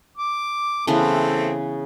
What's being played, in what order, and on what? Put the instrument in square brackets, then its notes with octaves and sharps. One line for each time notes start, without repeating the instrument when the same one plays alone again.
[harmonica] D6
[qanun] C#3 E3 B3 [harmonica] A3 C4 A4